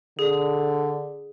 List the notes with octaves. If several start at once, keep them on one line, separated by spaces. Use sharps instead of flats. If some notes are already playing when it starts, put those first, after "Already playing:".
D3 G#4